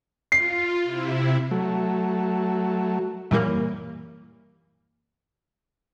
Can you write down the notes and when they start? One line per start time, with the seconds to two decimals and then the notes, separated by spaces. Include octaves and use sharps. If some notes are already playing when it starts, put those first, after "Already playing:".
0.32 F4 C7
0.83 C3 E4
1.51 F#3 A3
3.31 F#2 A#2 E3 G3 A#3